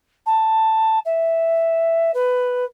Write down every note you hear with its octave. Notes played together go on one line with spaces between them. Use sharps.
A5
E5
B4